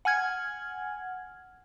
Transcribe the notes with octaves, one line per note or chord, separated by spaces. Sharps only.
F#5 G#5 F6 G#6